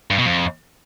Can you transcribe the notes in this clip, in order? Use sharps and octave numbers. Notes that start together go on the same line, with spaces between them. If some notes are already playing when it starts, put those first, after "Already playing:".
G2
B2
F2